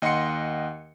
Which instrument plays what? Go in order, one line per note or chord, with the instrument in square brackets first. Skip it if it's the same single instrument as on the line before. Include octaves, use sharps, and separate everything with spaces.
[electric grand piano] D#2 D#5 F#5 C6 C#7